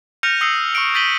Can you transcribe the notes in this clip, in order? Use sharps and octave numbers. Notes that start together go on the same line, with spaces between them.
F6 G6 A#6 C#7 D#7 F7
D#6 E6 A#6 C7 C#7
C#6 F6 C#7 D7
G6 A6 B6 D#7 F#7 G7